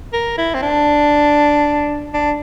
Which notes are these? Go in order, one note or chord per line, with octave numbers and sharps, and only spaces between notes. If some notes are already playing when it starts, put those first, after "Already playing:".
A#4
E4
C4
D4
D4